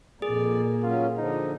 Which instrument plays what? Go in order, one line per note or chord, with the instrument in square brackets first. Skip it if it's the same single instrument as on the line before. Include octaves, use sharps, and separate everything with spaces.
[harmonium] F2 D5 [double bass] A#2 A#3 [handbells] G#4
[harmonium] F#3 C#4 [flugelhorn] F4
[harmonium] D3 F3 [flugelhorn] D#4